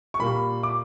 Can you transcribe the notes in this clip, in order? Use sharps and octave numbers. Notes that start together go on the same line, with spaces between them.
C#6
A#2 G3 A#3 B5
D6